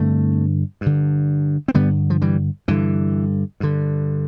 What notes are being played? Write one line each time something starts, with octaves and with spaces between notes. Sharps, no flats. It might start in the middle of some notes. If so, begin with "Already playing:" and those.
Already playing: G2 D3 A3 C4
G2
D3
C4
G2 D3 G3 B3
F3
E3 G3
G2 D3 E3
G2 D3